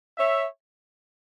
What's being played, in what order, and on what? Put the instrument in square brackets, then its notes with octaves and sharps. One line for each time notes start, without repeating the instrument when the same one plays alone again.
[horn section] C#5 E5